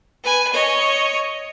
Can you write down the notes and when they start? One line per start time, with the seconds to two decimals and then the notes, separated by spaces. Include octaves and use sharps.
0.24 B4 G#5
0.53 C#5 D#5